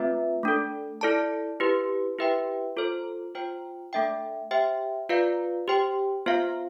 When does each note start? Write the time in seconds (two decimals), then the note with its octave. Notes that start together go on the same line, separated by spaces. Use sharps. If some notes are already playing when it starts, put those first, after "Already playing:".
Already playing: A3 C4 F4 B4 E5
0.43 A3 D4 A4
1.01 E4 A4 D5 A5
1.60 E4 G4 B4
2.18 E4 G4 B4 E5 G5
2.77 F4 A4 C5
3.35 F4 C5 G5
3.93 A3 D4 A4 E5 G5
4.51 G4 C5 E5 G5
5.09 F4 B4 D5 F5
5.68 G4 C5 G5
6.26 B3 F4 C5 F5